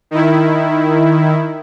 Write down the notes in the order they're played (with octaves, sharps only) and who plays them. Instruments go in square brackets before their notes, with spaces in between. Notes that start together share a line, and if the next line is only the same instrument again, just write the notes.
[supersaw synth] D#3 E4